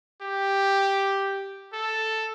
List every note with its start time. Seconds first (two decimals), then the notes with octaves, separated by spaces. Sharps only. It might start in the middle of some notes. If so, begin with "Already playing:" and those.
0.22 G4
1.73 A4